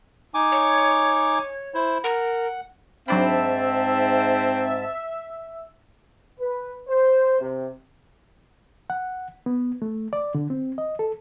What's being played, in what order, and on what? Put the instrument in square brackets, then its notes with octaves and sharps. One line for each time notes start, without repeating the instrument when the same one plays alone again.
[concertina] D#4 G#5 D6
[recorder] C#5
[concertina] E4 C5
[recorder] A#4 [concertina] F#5
[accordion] G#2 A5 [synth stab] F#3 D4 B5 [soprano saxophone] C4 [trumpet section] E5
[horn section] B4
C5
C3
[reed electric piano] F#5
B3
A3
D5
D3
C4
D#5
A4